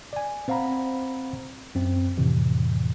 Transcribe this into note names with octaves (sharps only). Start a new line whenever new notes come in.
D5 G#5
C4 C5 F5 F#5 A#5 B5
F#2 C4
F2 A2 C3 E3